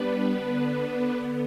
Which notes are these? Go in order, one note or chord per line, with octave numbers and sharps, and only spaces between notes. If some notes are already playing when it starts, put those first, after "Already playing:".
Already playing: G3 B3 D4 B4
D3 B3 D4 B4
D3 B3